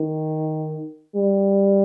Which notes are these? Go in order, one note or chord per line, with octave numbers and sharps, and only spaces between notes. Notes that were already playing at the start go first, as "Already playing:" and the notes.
Already playing: D#3
G3